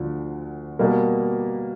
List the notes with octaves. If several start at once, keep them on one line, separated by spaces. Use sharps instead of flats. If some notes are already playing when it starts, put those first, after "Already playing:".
Already playing: D2 D3 F3
B2 G3 A#3